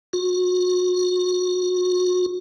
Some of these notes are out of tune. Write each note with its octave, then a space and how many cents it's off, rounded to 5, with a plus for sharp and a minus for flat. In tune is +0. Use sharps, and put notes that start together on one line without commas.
F#4 -35